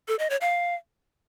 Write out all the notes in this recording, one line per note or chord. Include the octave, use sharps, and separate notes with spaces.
A4
D#5
C#5
F5